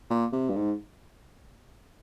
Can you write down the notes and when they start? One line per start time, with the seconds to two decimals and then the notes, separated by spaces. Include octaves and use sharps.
0.10 A#2
0.33 C3
0.50 G2
0.56 G#2